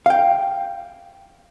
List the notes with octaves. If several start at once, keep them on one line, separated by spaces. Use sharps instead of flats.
F5 G5